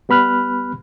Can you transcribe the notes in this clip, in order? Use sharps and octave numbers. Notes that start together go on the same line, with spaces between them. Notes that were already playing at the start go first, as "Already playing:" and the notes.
G3 B3 B5 F6 F#6